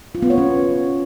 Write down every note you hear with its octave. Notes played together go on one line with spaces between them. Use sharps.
F4
B3
C#5
C#4